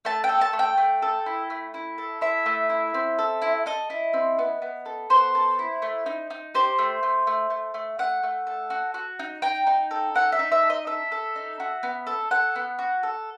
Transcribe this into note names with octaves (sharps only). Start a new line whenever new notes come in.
A3 A5
G5
A4
A5
A3
G5
A3
A4
E4
A3
E4
A4
E4 E5
A3
E4
C4
A4
E4
A4 D#5
E4
C4
B3
B3
A4
B3 C5
A4
E4
A3
D#4
D#4
G4 C5
A3
A3
A3
A3
A3
A3 F#5
A3
A4
F#4
F#4
D#4
D#4 G5
D#4
A4
D#4 F#5
E5
D#4
E5
A4
D#5
A4 E5
A4
D#4
F#4
B3
A4
A4 F#5
B3
F#4
A4